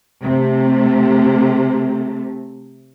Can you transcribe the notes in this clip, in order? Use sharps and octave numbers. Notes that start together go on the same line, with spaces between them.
C3 A3